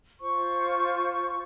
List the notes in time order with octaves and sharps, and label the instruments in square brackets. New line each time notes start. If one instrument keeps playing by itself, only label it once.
[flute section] F4 C5 C#6